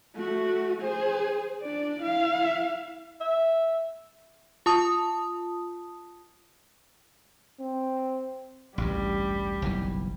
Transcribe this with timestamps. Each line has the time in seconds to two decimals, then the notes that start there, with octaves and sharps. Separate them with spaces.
0.15 A3 F#4
0.81 G#4 C5
1.62 D4 D5
2.01 E4 F5
3.21 E5
4.66 F4 A5 D#6
7.60 C4
8.78 A1 D2 G2 G3
9.62 F#1 B1 E3